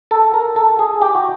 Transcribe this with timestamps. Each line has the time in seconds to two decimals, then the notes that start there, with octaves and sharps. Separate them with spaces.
0.11 A4
0.34 A#4
0.56 A4
0.79 G#4
1.02 G4
1.15 F#4